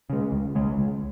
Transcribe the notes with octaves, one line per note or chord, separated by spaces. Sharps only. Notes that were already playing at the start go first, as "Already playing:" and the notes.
C#3 G#3
C#2
C#3 G#3
C#2